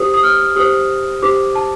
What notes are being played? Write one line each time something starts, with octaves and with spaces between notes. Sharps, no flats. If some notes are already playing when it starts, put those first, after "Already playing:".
Already playing: G4 C5 D#6
D#6
F6
G4 C5 D#6
G4 C5 D6
A5